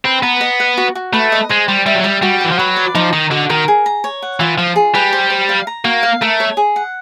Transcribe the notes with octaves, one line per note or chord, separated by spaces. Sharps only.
C4 B4
B3 A#5
D#5
F#5
F#4
F#4
A3 B4
D#5
G#3 C5
G3 C6
G3 E5
F#3
G3 G5
G3 F#4
E3 G5
F3
F#3 B4
D5
F3 D#4
D#3 D#5
D3 F#4
D#3 A#4
G#4
A#5
C#5
F#5
E3 F4
F3 F4
G#4
G3 B4
C5
C5
F5
A#5
A#3 F#4
F5
A3 A#4
C#5
G#4
F#5